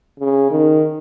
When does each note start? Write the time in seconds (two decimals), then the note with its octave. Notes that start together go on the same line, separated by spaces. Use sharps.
0.20 C#3
0.51 D#3